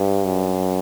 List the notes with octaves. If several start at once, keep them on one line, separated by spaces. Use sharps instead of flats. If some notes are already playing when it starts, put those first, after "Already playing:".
Already playing: G2
F#2